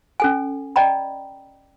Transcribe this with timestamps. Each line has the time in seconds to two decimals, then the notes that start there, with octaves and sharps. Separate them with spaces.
0.20 C#4 A4 G#5
0.76 D5 D#5 G5 A#5 B5